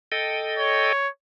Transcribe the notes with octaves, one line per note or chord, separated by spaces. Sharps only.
A4 D#5 G5
C#5